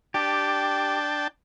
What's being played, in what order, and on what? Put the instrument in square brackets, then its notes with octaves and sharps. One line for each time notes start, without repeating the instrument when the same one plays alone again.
[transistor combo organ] D4 G5 A5 [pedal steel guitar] G4